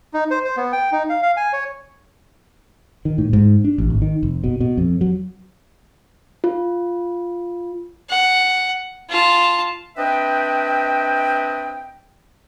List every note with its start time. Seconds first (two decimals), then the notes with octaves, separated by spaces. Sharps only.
0.14 D#4
0.31 C5
0.45 C5
0.57 B3
0.72 G5
0.92 D#4
1.09 F5
1.23 F5
1.37 G#5
1.53 C#5
3.05 D#3
3.18 A2
3.33 G#2
3.65 D4
3.78 A1
3.90 G#1
4.02 D#3
4.23 F1
4.44 B2
4.61 B2
4.78 F2
5.01 F#3
6.44 F4
8.10 F#5
9.09 F4 A5
9.97 C4 D4 B4 D#5 E5 G5